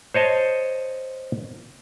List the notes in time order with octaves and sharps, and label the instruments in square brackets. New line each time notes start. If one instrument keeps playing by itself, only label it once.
[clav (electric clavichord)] C5 C#5 D#5 A5